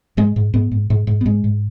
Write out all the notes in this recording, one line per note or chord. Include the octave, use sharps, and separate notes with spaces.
G#2 G#3
G#2
G#2 B3
G#2
G#2
G#2
B3
G#2 G#3
G#2